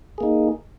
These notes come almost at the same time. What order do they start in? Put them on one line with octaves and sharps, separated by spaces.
G#4 A#3 D#4